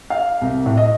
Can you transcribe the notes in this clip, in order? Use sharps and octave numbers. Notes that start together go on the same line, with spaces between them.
F5
C2
A2
D#5